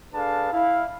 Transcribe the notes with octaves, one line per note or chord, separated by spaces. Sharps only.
D4 G#4 A4 B4 F5 A5
E4 F5